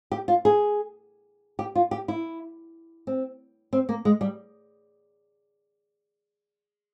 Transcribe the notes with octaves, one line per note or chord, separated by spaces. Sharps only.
G4
F4
G#4
G4
F4
G4
E4
C4
C4
A#3
G#3
G3